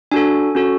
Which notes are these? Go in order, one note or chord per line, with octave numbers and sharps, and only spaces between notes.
D4 F#4 A4 G#5
C#4 F#4 A4